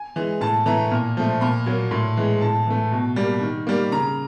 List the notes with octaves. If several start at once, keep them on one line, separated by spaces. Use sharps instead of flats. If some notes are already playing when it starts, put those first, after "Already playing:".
Already playing: G#5
E3 G#3
A2 A5
E3 A3 A#5
A#2
F3 A3
A#2 B5
F#3 A#3
A2 C6
E3 G#3
A2 A5
E3 A3
B2
G3 A#3
D#3
G3 A#3
C#3 A#5